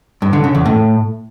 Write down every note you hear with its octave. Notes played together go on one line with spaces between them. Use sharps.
G2
D3
C#3
E2
A2